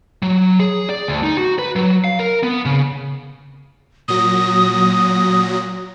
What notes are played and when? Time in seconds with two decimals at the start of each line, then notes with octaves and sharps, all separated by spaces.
0.23 F#3
0.60 G#4
0.89 D5
1.08 D2
1.23 D#4
1.38 F#4
1.59 B4
1.76 F#3
2.04 F5
2.19 A#4
2.43 B3
2.65 C#3
4.08 A#2 F#3 D#6 A#6